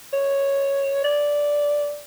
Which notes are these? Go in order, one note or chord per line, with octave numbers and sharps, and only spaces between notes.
C#5
D5